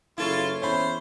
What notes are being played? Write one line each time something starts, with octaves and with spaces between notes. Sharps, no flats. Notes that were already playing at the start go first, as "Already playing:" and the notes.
F#1 E4 F4 A4 C#5
E2 C#4 C5 E5 B5